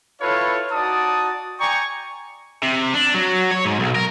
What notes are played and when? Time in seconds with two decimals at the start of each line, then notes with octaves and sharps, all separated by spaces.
0.21 E4 F4 A4 B4 C#5 F5
0.72 D#4 F#4 D5 A5 D#6
1.60 D5 G5 G#5 A#5 C#6
2.63 C3
2.94 D4
3.14 F#3
3.51 C#5
3.65 G#2
3.79 B1
3.95 A#4